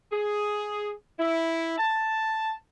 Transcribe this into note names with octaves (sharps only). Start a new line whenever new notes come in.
G#4
E4
A5